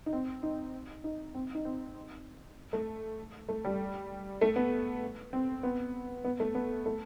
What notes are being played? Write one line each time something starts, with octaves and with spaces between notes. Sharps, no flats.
D#4
C4
D#4
D#4
C4
D#4
C4
A3
A3
G3
A3
B3
C4
B3
B3
A3
B3
A3